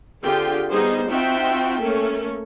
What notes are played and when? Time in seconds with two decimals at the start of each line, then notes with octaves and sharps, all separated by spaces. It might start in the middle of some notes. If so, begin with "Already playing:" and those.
0.23 D3 C4 F4 G4 G#4 G5
0.70 G3 B3 D#4 G#4 C5
1.08 C4 D#4 F4 F#4 E5 G5
1.81 A3 A#3 C#4 A4